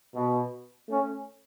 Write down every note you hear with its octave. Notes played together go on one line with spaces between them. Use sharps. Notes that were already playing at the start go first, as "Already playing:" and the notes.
B2
A3 C#4